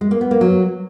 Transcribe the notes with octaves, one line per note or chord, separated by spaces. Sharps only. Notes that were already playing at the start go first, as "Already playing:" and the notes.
G#3
A#3
B3
A#3
F#3